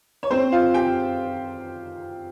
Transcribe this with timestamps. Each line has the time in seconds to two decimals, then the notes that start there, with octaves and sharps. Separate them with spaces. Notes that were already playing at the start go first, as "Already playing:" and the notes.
0.23 C#5
0.31 C4 C5
0.52 F4 F5
0.74 G4 G5